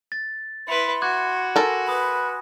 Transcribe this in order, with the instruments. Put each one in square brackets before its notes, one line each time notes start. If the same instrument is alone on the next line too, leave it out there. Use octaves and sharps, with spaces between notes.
[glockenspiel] A6
[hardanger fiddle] E4 B4 [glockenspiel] B5 C#7 [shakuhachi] C6
[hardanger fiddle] F#4 [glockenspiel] D6 F#6 G#6
[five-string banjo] A4 A#4 [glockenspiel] G#5 C6 A#6
[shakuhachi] B4 [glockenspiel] B5 D#6